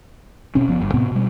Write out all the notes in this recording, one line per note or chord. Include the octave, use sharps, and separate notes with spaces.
B2 C4 C#4
F#1 F3 B3
G1 G2
A2 C3 B3 C4
B2 G3